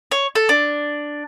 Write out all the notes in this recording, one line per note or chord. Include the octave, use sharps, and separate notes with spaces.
C#5
A4
D4